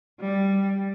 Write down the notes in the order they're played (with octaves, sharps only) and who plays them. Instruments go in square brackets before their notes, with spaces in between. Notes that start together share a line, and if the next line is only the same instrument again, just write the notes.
[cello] G3